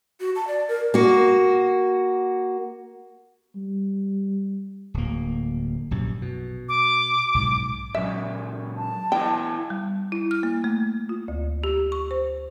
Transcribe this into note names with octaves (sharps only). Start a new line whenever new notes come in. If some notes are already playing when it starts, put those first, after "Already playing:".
F#4
A5
D5
A#4
A#3 F#4
G3
D1 A#3
A#1 F#2 C3
B2
D6
B1 G#2
A#2 C#3 F#3 E5
A5
B3 E4 D#5 G5
G3
E4
F6
A#3
A3
F4
D2
G4
C#6
C5